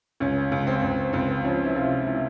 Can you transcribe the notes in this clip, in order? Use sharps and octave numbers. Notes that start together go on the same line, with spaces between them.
C#2 C#4
C#2
C4
C#2
C#2 C4
F3 C#4
E4
C3 F4
C3 E4